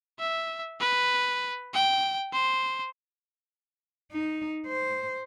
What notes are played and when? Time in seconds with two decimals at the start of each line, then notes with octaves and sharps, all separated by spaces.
0.19 E5
0.80 B4
1.74 G5
2.33 C5
4.12 D#4
4.66 C5